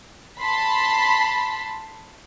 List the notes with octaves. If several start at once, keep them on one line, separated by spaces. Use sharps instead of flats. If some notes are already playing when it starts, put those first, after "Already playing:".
A5 B5 C6 B6